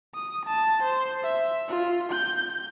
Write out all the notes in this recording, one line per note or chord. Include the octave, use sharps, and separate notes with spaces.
D#6
A5
C5
E5
F4
G6